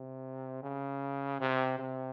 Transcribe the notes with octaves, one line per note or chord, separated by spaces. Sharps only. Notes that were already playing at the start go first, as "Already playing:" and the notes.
Already playing: C3
C#3
C3
C3